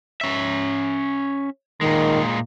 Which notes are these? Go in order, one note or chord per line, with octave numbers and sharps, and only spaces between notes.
C#4 E5
A#2 D#3 G#3